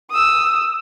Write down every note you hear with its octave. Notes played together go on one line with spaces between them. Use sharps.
D#6 E6